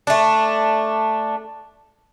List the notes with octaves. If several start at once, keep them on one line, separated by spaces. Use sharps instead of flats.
A3 D4